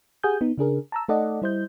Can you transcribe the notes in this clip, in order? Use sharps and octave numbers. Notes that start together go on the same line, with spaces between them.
G4 G#4 F#5 G#5 D#6 G6
B3 D#4
C#3 D4 G#4 A#4
A5 A#5 E6
A3 D#4 A4 D5 D#5 F#5
G3 E4 C5 D#5 G6